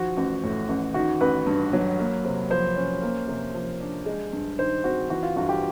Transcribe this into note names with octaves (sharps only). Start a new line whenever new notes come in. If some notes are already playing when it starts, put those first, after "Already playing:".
Already playing: D#3 F3 F#4
A1
A2
A1
D#3 F#4
A1 B4
G2
F#3
A#3
C3
F3 C5
C#4
A#3
C3
F3
D4
G#3
G2
D#3 C5
C4 F#4
E3 F#4
F4
G1 F#4
G4